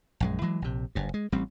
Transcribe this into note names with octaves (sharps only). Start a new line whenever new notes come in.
A#1 F#2 G#3
E3 F#3 G#3
A#1 C3
F#1 G2
G#3
A1 G3 C4